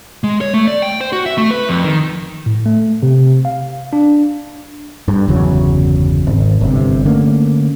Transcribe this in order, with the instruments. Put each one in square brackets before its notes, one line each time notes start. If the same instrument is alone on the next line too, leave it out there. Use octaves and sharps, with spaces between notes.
[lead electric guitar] G#3
C#5
A3
D5
G5
C5
F#4
E5
A3
B4
F2
D#3
[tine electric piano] A2
A3
C3
F5
D4
[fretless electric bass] G2
G1 E2 C#3 F#3
G#1
G1 C3
D3 A3 A#3 C#4